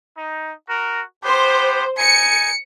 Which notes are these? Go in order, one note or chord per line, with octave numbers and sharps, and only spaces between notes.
D#4
F#4 A#4
B3 G4 C5
D#4 G#5 C#7